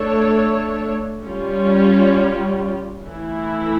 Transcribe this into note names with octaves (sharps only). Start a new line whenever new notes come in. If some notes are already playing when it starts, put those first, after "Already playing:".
Already playing: A3 D4 A4 C#5
G3 C#4 F4
E3 A3 E4